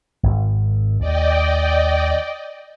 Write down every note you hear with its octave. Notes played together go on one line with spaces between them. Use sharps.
G#1
D#2 D5 D#5 G5